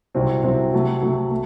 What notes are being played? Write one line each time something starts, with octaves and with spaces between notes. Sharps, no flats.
C2 C3 F#3 C4
C2 C3 F#3 C4
C3 F#3 A3
C3 F#3 A3
A3